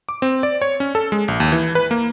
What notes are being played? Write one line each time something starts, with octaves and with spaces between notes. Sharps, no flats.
D6
C4
D5
C#5
C#4
A4
G#3
A#1
D#2
E3
B4
A#3